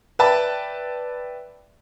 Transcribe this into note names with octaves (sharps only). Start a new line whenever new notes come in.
B4 D5 E5 G5 A5 B5